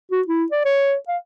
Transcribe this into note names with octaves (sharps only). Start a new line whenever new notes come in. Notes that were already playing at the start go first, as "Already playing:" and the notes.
F#4
E4
D5
C#5
F5